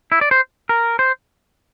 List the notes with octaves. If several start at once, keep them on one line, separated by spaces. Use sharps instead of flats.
E4
D5
C5
A#4
C5